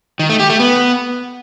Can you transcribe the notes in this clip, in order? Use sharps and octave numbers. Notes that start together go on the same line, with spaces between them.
D#3
A3
G4
A3
B3